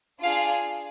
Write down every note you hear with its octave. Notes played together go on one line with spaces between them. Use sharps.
D4 F4 G#4 F5